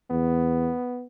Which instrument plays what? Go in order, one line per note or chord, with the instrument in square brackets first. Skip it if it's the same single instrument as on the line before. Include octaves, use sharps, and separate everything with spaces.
[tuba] E2 [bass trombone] B3